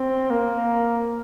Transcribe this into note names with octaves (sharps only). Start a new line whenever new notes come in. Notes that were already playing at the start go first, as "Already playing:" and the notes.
Already playing: C4
A#3